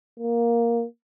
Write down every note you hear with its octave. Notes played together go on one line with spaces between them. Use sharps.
A#3